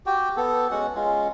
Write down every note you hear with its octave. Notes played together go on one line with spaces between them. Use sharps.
F#4 G4 G5
B3 A4
G#3 C#4 F#4 F#5
G#3 C#4 F4